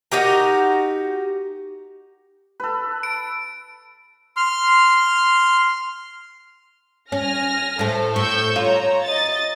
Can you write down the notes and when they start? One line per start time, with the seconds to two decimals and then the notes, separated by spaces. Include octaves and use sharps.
0.12 D#4 F#4 G4 A#4
2.60 A4 B4
3.03 D7
4.37 C6 F6
7.12 C#4 G#5 F6 A#6
7.79 A2 A3 A4 C5
8.16 A2 C#6 E6 G6
8.56 F4 C#5 A#5
9.04 D#5 A6